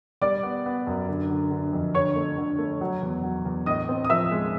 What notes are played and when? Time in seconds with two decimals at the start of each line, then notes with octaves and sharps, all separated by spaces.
0.21 G3 D5 D6
0.43 B3
0.66 B3
0.87 F#2
1.09 D3
1.30 D3
1.51 D3
1.73 F2
1.95 D3 C#5 C#6
2.16 A3
2.38 D3
2.58 A3
2.81 F#3
3.02 E2
3.23 F#3
3.45 E2
3.66 A2 D#5 D#6
3.89 C4
4.04 D#6
4.10 F3 E5 E6
4.32 G#3